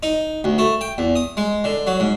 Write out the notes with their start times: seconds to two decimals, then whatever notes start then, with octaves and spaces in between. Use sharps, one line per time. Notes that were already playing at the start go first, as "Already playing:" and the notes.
0.03 D#4
0.44 D2
0.58 A3
0.81 G5
0.98 E2
1.16 D#6
1.37 G#3
1.64 D3
1.87 F#3
2.00 G#2